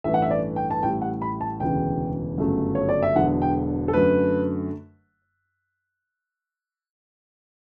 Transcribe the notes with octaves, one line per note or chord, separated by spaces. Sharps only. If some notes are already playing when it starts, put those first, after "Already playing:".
A1 G2 E3 A3 E5
F#5
E5
D5
G5
A5
A1 A2 G3 G5
F#5
B5
A5
E1 D2 C#3 E3 G5
G1 F#2 C#3 F#3 A3
C#5
D5
E5
E1 E2 D3 F#3 F#5
G5
A4
F#2 D3 A3 B4